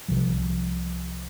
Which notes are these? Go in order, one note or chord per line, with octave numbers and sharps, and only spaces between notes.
C2 C3 F3